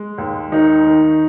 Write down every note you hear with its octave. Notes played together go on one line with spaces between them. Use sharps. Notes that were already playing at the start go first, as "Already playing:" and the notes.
Already playing: G#3
D#2
D#3 D#4
D#3